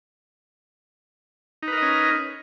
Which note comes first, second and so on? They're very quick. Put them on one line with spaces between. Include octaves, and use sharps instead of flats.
D#4 B4 A#4 D#5 C#4